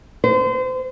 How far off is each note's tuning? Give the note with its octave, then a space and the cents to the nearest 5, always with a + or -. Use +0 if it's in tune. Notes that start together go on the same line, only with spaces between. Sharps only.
C5 -35